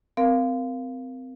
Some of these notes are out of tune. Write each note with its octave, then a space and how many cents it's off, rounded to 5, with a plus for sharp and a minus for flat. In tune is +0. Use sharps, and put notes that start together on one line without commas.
C4 -25 A#4 +0 F5 +0